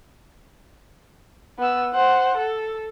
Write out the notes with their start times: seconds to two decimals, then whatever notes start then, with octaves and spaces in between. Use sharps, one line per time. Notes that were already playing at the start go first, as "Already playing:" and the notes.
1.59 B3 E6
1.93 C5 F#5
2.37 A4